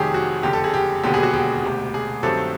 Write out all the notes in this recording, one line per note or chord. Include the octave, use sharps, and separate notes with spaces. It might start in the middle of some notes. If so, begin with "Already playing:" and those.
Already playing: F1 F2 C3 D#3 F#3 G4 G#4
F#4
F#1 F2 D3 G4
A4
G#4
G4
E1 D#2 D3 F#3 B3 G4
G#4
F#4
G4
E1 D2 C3
G#4
G2 D#3 F#3 A3 C4 A4